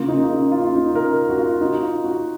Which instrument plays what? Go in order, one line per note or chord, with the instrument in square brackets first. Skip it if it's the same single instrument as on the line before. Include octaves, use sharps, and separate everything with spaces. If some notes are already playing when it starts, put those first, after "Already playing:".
Already playing: [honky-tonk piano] C#3 A#3 [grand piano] F4
[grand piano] D#4
D#4
F4
D#4
A#4
F#4
F4
D#4
F4
F#4